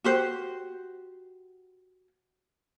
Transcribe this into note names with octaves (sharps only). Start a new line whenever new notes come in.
F#4 G4 C5